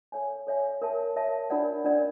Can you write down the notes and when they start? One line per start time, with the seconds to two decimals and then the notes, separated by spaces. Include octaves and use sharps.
0.12 A4 C#5 E5 G#5
0.47 A4 C#5 E5 G#5
0.82 A#4 C#5 E5 A5
1.16 A#4 C#5 E5 A5
1.50 D4 F4 A#4 D5 F#5
1.84 D4 F4 A#4 D5 F#5